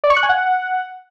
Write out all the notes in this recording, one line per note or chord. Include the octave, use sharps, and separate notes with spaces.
D5
C#6
F#6
G#5
F#5